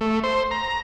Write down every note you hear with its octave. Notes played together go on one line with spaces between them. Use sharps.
A3
C5
A#5